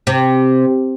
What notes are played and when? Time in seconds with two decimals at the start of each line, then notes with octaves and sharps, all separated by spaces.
0.07 C3